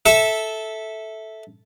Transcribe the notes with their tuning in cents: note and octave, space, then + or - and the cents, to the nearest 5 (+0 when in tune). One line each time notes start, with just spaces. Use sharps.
A4 -5 E5 -10